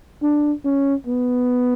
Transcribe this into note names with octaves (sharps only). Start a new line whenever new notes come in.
D4
C#4
B3